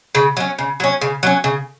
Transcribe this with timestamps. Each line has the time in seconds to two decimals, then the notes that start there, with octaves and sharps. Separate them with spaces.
0.15 C#3
0.37 F#3 C#4
0.59 C#3
0.80 F#3 C#4
1.01 C#3
1.23 F#3 C#4
1.44 C#3